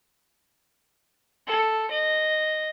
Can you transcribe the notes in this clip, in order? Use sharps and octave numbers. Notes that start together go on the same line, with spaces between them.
A4
D#5